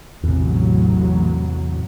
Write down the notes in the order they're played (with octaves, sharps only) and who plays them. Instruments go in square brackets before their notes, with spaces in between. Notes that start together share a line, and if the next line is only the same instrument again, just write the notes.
[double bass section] A1 A2 F#3 [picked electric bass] E2 C3